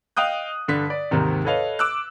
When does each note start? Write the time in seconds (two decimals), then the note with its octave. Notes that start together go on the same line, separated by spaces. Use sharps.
0.17 D#5 F5 G5 D#6 F#6
0.68 G2 D3 B6
0.90 D5
1.11 D#2 G#2 C3 D#3
1.45 A4 B4 C#5 D#5 F5
1.79 D6 E6 F#6